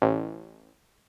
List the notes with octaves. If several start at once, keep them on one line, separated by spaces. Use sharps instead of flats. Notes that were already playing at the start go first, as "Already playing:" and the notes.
A1